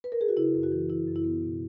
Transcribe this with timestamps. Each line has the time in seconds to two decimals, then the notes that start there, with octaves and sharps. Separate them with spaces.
0.04 B4
0.12 A#4
0.21 G#4
0.29 F#4
0.37 C#3 E4
0.54 F#2
0.63 F#4
0.72 E3
0.89 E3 E4
1.07 F#2
1.16 E4
1.24 B3
1.42 B2